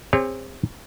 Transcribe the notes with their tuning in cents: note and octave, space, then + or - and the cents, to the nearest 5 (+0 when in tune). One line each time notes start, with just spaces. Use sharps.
C4 +0 G#4 -45 C#5 +0